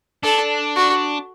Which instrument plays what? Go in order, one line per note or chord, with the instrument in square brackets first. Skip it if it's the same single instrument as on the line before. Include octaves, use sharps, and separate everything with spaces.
[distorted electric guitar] D4 [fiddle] A4
[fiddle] F#4